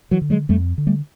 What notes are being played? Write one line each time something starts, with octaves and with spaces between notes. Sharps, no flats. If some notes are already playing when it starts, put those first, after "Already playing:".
E3 F#3
D3
F#3 G#3
F2 G3 A3
D3
G3 A3